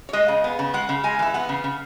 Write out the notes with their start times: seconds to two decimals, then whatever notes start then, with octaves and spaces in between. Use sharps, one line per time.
0.09 C#5
0.13 G#3 D#5
0.28 C#3
0.44 B3
0.59 C#3
0.74 G#3 F#5
0.89 C#3
1.04 G#3 G#5
1.19 E3 E5
1.34 B3 F#5
1.49 C#3
1.64 C#3